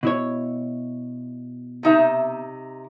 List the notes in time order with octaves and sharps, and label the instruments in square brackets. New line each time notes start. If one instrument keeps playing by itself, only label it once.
[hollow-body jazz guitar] B2 E4 C#5
[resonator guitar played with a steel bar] C3 D#4 E5